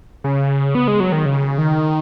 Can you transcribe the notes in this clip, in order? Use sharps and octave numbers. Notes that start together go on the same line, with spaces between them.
C#3
B3
G#3
F#3
D#3
C#3
D#3